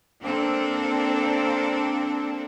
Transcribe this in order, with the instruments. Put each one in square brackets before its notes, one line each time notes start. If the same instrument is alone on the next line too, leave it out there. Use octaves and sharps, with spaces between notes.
[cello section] A#3 C4 D4 A4